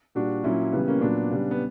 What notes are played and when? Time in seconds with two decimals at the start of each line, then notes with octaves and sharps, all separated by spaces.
0.15 A#2 G3 D4 F#4
0.44 A#2 F#3 C#4 E4
0.73 C#3 E3 G3 B3
0.88 A#3 C#4
1.01 A#2 F#3 B3 D4
1.31 C#3 G3
1.51 B3